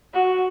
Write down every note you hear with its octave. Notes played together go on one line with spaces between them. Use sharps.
F#4